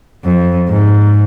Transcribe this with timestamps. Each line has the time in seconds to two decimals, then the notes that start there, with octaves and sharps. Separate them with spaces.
0.24 F2
0.70 G#2